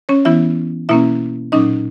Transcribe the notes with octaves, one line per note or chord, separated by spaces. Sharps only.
C#4 C#5
E3 B3 E4 E5
B2 A#3 C#4 E4 E5
A#2 F#3 C#4 D#4 D#5